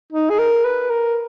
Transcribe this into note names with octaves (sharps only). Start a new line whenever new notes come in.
D#4
G#4
A#4
B4
A#4